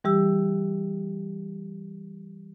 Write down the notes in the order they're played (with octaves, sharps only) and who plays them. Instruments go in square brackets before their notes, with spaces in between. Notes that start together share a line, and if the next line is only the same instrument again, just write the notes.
[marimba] E3 G3 G4 E6